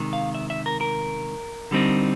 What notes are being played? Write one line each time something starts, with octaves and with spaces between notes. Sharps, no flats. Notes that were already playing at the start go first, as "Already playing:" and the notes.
Already playing: C3 D#3 G#3
F5
E5
E5
A#4
A#4
D3 G3 C4 D#4